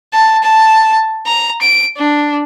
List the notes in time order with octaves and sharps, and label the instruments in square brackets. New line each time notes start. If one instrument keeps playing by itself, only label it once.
[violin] A5
A5
A#5
D7
D4